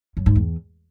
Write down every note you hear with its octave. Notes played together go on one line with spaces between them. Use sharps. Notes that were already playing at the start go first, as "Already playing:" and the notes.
F#2
G#2
E2